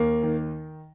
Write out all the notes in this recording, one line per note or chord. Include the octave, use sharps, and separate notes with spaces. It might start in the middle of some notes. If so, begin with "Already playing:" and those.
Already playing: D#2 A#3
D#3